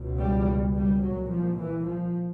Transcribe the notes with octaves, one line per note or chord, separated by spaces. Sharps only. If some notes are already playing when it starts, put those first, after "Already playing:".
Already playing: C#2 B2
G3
G3
C2 A#2 F#3
F3
E3
F3